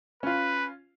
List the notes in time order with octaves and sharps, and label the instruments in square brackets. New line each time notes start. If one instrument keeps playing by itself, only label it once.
[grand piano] C#4 F4 [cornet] B4